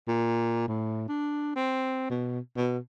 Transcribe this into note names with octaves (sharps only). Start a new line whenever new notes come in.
A#2
A2
D4
C4
B2
B2